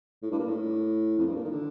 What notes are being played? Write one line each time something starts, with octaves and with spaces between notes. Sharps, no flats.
A2
G2
A#2
A2
F2
G2
A#2
D#3
D3